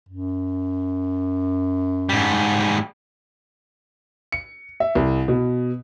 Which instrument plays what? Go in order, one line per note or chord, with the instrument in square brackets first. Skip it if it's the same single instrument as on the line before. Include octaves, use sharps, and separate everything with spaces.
[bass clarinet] F#2
[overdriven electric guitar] G#2 G3
[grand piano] C#7
E5
C2
B2